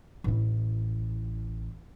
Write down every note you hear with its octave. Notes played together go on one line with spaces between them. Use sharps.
A1 E4